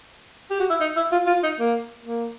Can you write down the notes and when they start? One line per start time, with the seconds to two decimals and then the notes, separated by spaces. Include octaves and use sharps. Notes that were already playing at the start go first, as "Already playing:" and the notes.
0.50 G4
0.60 F#4
0.70 E4
0.81 D#4
0.97 E4
1.12 F4
1.27 F4
1.43 D#4
1.60 A#3
2.06 A#3